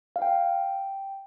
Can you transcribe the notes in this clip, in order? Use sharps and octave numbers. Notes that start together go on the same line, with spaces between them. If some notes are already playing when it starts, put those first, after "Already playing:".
F5
G5